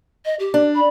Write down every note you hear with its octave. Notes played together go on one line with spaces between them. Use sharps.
D#5
G4
D4
B5